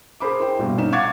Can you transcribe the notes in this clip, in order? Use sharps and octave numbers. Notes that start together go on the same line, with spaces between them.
G#4 A#4 C5 B5 D6
E4 C5 G5
A#1 G2 B2
A#1 C#4 D#4 E7
F5 F#5 C#6 D6 G#6 A6